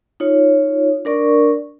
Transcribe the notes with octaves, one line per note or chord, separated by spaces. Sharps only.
D#4 F4 C#5
D4 A#4 D5 C#6